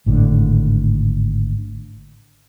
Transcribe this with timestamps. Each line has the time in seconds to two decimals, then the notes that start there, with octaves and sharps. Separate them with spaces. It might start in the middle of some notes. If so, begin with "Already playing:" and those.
0.06 G#1 A2 D3